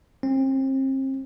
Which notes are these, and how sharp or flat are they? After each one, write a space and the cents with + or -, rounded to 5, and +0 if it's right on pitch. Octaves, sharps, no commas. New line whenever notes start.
C4 +35